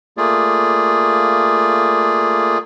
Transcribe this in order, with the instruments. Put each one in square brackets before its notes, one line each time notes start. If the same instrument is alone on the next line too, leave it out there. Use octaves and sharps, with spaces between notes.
[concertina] A3 A#3 F4 G#4 D5